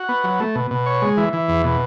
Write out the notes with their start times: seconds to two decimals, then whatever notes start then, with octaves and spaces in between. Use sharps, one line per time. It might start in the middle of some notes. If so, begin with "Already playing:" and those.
Already playing: F#4
0.09 B3
0.24 F#3
0.40 A3
0.55 B2
0.71 B2
0.86 C#5
1.02 G#3
1.17 E3
1.33 E3
1.48 E2
1.64 B2